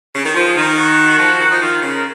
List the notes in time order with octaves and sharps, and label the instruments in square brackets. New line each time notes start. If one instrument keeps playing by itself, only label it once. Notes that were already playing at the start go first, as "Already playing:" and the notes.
[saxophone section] C#3
D#3
[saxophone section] F3 [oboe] C5
[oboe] G#4
[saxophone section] D#3 [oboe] A#4
[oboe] F#4
[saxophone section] F3
D#3
[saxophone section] F3 [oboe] D#4
[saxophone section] D#3 [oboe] F4
[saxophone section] C#3
[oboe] A#4